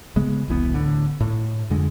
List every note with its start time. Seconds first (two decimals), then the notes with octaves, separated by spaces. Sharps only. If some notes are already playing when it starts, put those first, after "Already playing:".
0.16 C#3 G#3 B3
0.48 E1 C2 E3 B3
0.74 D1 A2 D3
1.20 A2
1.70 F2 D3 G#3